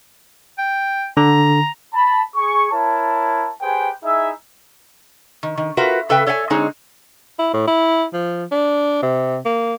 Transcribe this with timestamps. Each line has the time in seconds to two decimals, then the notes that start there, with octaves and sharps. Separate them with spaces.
0.58 G5
1.17 D3 A#5
1.94 A5 B5
2.36 G#4 C#6
2.72 E4 A#4 C#5 A5
3.62 G4 G#4 B4 C5 G5 G#5
4.04 D#4 E4 G#4 E5
5.43 D#3
5.57 D#3
5.77 F4 F#4 A#4 B4 E5
6.09 C#3 A4 B4 E5 G5
6.26 A4 C#5 D5 E5 F#5 G#5
6.50 D3 G#3 C4 D#4 G#4 C#5
7.39 E4
7.53 A2
7.67 E4
8.13 F3
8.51 D4
9.02 C3
9.45 A#3